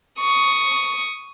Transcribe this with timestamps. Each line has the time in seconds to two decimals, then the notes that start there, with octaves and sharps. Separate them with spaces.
0.20 C#6 D#6